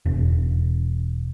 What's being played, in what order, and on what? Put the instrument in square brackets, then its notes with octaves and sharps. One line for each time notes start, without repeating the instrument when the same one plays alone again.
[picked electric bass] E1